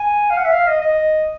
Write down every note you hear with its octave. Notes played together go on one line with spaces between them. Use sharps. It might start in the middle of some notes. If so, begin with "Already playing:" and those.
Already playing: G#5
F5
F#5
E5
F5
D#5
D#5